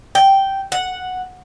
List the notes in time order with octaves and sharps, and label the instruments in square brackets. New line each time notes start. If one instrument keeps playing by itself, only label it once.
[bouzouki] G5
F#5